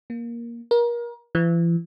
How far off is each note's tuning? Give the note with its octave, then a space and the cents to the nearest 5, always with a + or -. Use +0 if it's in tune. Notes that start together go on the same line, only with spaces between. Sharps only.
A#3 +10
A#4 +30
E3 +40